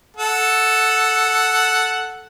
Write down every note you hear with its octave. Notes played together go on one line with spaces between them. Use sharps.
A4 F#5